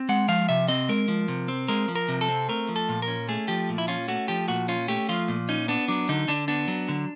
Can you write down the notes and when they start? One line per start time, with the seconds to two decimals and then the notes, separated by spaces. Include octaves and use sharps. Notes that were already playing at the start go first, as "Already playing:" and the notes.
Already playing: C4
0.09 G#3 F#5
0.28 F3 F5
0.49 C3 E5
0.68 C4 D#5
0.89 G#3 A#4
1.08 F3
1.28 C3
1.48 C4
1.68 G#3 A#4
1.88 F3
1.96 A#4
2.08 C3
2.21 A4
2.28 C4
2.49 A3 A#4
2.69 F3
2.76 A4
2.89 A#2
3.02 A#4
3.08 C#4
3.29 A3 G#4
3.48 F3 G4
3.69 A#2
3.78 E4
3.88 C#4 F4
4.08 A3 F#4
4.28 F3 G4
4.48 A#2 F#4
4.68 C#4 F4
4.88 A3 G4
5.09 F3 F4
5.28 A#2
5.49 C#4 D#4
5.68 B3 D4
5.88 F#3 D4
6.09 D3 D#4
6.28 D3 D4
6.48 B3 D4
6.68 F#3
6.88 D3